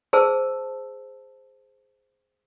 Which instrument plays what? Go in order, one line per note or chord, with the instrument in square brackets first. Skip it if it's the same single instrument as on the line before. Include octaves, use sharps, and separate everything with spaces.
[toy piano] G#4 C5 A5 E6